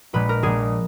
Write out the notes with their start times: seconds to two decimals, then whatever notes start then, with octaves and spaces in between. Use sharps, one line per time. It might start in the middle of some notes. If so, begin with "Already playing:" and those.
0.13 A#1 A#2 G#3 B4
0.29 A#4
0.43 A#1 A#2 G#3 G#4